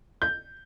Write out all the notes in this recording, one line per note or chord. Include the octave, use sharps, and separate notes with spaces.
G6